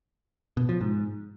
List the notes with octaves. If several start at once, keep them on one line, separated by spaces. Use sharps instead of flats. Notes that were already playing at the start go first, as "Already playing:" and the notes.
B2
F3
G#2